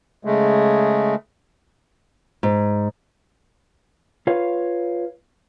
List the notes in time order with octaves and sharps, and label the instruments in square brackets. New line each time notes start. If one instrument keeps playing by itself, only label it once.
[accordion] C#3 G#3 A3
[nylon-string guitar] G#2
[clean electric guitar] F4 B4 C#5 F5